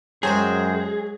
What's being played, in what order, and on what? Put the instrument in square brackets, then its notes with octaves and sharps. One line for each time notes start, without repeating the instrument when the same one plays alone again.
[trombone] F#2 [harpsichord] F#3 G#3 [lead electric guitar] G#4 [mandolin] C5 G5